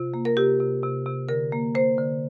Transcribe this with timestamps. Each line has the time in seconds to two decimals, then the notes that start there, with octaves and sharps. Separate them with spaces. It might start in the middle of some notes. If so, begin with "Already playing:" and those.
Already playing: C3 F4
0.14 A#3
0.25 A#4
0.37 C3 G4
0.60 C3
0.83 C3
1.06 C3
1.29 D3 A#4
1.52 A#3
1.75 A#3 C5
1.98 D3